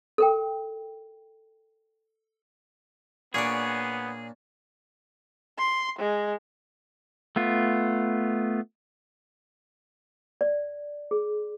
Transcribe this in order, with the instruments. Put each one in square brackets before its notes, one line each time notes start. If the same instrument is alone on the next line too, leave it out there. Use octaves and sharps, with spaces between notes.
[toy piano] A4 A#4 G5
[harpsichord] A#2 D4 [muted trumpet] B3 [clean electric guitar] G#4 [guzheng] C#5 D5
[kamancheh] C6
G#3
[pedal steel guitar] A3 B3 F4
[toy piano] D5
G#4